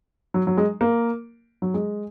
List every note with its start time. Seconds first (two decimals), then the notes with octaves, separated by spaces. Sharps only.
0.34 F#3
0.47 F#3
0.57 G#3
0.81 A#3
1.62 F#3
1.74 G#3